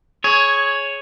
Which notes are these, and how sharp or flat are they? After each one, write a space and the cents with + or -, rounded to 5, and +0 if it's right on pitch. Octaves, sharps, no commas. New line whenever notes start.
G#4 +15 C#5 +0